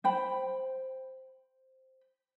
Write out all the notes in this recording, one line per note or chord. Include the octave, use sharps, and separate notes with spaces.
C5 G5 B5